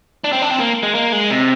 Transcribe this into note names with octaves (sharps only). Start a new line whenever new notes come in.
D4
C4
D4
C4
A#3
G#3
A#3
G#3
C3